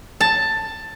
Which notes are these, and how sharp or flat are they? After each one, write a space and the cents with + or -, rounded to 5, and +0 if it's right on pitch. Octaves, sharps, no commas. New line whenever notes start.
A5 +10